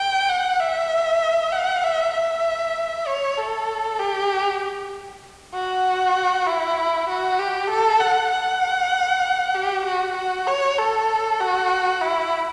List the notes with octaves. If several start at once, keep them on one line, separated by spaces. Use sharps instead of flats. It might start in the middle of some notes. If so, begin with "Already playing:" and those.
Already playing: G5
F#5
E5
F#5
E5
E5
C#5
A4
G4
F#4
E4
F#4
G4
A4
F#5
F#5
G4
F#4
F#4
C#5
A4
F#4
E4